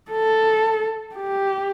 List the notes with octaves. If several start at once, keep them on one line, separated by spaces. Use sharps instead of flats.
A4
G4